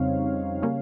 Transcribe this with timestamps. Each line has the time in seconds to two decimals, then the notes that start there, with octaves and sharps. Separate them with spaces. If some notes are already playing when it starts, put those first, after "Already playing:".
Already playing: F2 C#3 G3 C4 D#4 C#5 F5
0.62 C#3 G3 A#3 C#4